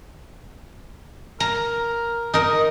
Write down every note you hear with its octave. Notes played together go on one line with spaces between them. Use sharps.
A#4 A#5
D#4 A#4 D#5